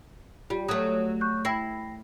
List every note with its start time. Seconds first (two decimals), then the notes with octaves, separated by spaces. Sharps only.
0.50 G3 F4
0.68 F#3 A3 D#6
1.21 C#6 F#6 G6
1.45 E4 G5 A#6 C7